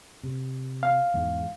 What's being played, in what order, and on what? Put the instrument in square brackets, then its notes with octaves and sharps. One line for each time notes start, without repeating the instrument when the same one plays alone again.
[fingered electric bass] C3
[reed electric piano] F5
[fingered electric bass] E2 G#2